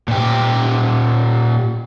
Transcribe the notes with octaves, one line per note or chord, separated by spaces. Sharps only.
A#2 G4